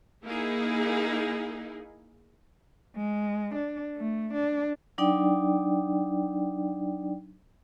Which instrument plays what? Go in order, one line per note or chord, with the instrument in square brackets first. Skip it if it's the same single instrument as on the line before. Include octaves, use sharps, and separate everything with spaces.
[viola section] A#3 D#4 E4 G#4
[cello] G#3
D4
A3
D4
[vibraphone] F#3 D4 D#4 D5 G5